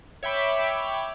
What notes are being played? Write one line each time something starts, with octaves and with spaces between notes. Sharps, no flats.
C#5 E5 G5 B5 D6